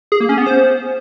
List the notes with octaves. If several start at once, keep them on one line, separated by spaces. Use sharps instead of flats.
G#4
A#3
C#4
B3
C5